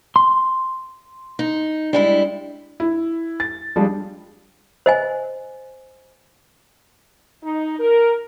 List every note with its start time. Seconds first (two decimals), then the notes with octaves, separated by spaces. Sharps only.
0.16 C6
1.39 D#4
1.93 G3 G#3 D4 E4
2.80 E4
3.40 A6
3.76 F3 G3 G#3 D4
4.86 C5 D#5 G#5
7.44 D#4
7.79 A#4